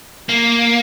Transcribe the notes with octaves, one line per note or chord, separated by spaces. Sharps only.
A#3